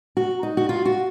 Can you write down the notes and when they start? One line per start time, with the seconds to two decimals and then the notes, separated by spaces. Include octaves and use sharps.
0.17 F#4
0.43 D#4
0.57 F#4
0.69 F4
0.85 F#4